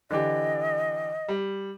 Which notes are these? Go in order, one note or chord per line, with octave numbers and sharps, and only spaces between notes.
D3 E3 G4 D#5
G3